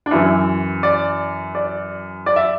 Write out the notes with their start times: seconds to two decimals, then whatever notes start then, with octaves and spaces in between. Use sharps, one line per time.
0.06 D4
0.11 F#2 E3 E4
0.83 D5
1.55 D5
2.26 D5
2.36 E5